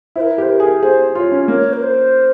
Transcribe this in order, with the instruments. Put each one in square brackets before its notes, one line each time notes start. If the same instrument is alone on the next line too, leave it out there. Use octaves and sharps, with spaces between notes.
[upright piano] E4 [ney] C5
[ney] A#4
[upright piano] G4 [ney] C5
[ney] A#4
[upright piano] G#4
[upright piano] G#4 [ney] C5
[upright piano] F4 [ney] C#5
[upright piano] C#4
[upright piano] A#3 [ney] C#5
[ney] A#4
C5